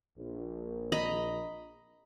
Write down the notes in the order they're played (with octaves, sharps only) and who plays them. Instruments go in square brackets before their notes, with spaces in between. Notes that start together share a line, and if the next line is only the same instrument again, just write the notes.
[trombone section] A#1
[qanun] D#5 A#5 B5